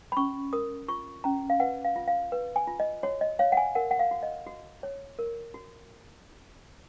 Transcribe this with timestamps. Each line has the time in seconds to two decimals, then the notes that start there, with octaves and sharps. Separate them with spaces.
0.12 B5
0.17 C#4 C#6
0.53 A#4 D#6
0.88 F4 C#6
1.24 C#4 A#5
1.50 F5
1.60 B4 F#5
1.85 F5
1.96 F4
2.08 F5
2.32 B4
2.56 G#5
2.67 F4
2.80 D#5
3.03 F#4 C#5
3.21 D#5
3.39 C#5 F5
3.52 F#5
3.57 G#5
3.75 A#4 F#5
3.91 F#5
3.99 F5
4.11 F#4
4.23 D#5
4.47 F#4
4.83 C#5
5.19 A#4
5.54 F#4